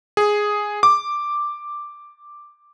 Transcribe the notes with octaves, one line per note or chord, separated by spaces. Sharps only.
G#4
D6